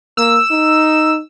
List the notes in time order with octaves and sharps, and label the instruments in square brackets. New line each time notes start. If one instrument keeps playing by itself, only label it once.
[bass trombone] A#3 [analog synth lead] E6
[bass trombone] D#4